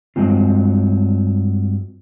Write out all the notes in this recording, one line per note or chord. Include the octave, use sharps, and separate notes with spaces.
G2 F#3 G#3 C4 F4